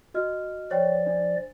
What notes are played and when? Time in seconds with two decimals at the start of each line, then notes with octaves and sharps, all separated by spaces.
0.14 F#4 D#5 F6
0.71 F3 C#5 D5 G5
1.07 D4